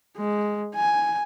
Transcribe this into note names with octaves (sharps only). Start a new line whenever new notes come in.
G#3
G#5